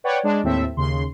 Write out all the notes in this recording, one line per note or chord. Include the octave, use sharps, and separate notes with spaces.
B4 C#5 D5 F#5 G5
G#3 D4
D#2 A2 C4 A4 E5
D#2 C#3 C6